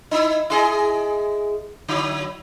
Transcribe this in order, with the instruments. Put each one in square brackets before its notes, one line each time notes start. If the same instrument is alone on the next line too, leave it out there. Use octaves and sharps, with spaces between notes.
[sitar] D#4 E4
E4 G#4 D#5
D3 F#3 E4